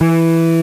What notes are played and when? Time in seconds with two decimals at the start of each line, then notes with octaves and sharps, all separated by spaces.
0.01 E3